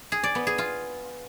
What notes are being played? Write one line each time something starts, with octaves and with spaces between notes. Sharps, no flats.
G#4
D5
B3
G#4
F4